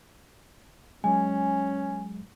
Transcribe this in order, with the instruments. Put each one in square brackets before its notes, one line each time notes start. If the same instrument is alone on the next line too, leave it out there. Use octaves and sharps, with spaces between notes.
[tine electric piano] F#3 G#3 [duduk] C#4 [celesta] G#5